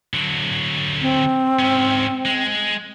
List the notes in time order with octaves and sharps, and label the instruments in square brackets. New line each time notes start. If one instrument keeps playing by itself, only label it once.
[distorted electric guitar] D3 F#3
[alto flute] C4
[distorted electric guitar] G#2 C#4
G#3